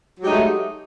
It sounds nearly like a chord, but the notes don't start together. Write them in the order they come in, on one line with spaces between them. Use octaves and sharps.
F#3 G4 G#3 D#4 A3